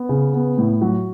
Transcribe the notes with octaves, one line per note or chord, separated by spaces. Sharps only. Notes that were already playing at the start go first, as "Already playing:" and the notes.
Already playing: B3
C#3
B3
A2
F#3